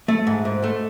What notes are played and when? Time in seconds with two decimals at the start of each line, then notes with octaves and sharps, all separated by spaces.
0.08 A3
0.27 G#2
0.45 G#2
0.64 A3